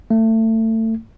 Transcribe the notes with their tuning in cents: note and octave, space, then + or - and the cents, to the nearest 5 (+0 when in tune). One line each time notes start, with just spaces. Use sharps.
A3 +25